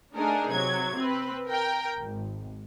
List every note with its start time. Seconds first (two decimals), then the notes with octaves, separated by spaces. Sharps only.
0.15 A3 D4 D#4 G#4 A#4
0.52 C3 F#3 G#6
0.98 C4 B4
1.47 A#4 G5
1.99 G#1